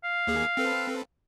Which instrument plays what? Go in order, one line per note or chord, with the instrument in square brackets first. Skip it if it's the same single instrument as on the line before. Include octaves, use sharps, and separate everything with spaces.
[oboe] F5
[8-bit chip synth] D#2 A#3 G#4
C4 A4 B4